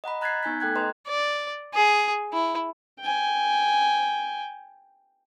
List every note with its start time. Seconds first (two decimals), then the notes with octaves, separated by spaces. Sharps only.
0.04 D#5 F#5 A#5 B5
0.21 A#5 F#6 G#6 A6 B6 C7
0.43 B3 D#4 G#5 G6 B6
0.60 A3 A4 G5 F#6 G#6
0.75 B4 D#5 A#5 C6
1.08 D5
1.75 G#4
2.33 E4
3.00 G5 G#5